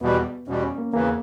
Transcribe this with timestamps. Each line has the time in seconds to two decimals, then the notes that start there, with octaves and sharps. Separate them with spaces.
0.01 E2 B2 G3 B3
0.48 E2 B2 G3 C#4
0.63 C#4
0.78 A#3
0.93 E2 C#3 E3 A#3